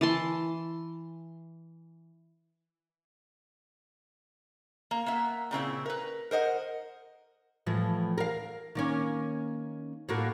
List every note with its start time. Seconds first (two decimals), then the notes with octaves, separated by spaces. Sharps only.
0.01 E3 A5 C6
4.91 A#3
5.06 A#3 B3 E5
5.51 A#2 C#3 C4 E4
5.85 A#4 B4
6.31 A#4 C5 D#5 F#5
7.67 A2 E3 F3
8.18 A#4 F5
8.75 D#3 A#3 C#4
10.09 A2 A#3 F#4